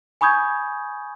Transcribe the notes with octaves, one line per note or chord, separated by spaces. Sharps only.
G#5 B5 C#6 D#6 G6 G#6